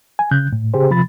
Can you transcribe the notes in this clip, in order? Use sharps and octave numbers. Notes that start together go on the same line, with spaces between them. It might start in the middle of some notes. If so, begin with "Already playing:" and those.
G#5
C#3 F#6 G6
A2
C#3 G4 G#4 C5
C3 F3 B5 A6